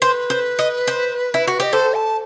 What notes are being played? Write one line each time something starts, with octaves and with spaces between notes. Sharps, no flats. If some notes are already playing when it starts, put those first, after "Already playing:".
B4 C5
C5
D#5
C5
E4
F#4
G4 D#5
A4 C5
A5